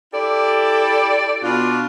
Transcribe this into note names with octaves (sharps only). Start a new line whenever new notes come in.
E4 G4 A4 D5
B2 D4 F4